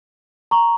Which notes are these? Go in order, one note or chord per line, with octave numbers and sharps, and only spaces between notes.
A#5 C#6